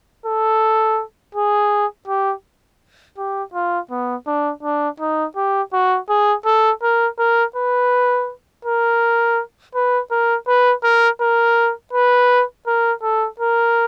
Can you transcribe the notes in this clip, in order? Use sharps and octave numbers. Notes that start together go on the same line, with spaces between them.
A4
G#4
G4
G4
F4
B3
D4
D4
D#4
G4
F#4
G#4
A4
A#4
A#4
B4
A#4
B4
A#4
B4
A#4
A#4
B4
A#4
A4
A#4